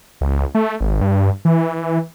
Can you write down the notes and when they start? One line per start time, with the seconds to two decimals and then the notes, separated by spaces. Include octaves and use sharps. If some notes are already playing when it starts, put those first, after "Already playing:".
0.21 C#2
0.55 A3
0.81 G#1
1.01 G2
1.45 E3